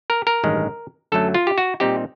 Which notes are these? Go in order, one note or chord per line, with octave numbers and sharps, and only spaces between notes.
A#4
A#4
A1 G2 D#3 G#3
F#2 D3 F#3 A3 A4
F4
G4
F#4
A#2 G3 C4 D#4 G4